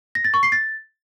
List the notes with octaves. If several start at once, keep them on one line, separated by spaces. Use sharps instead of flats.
A#6
A6
C#6
C7
A6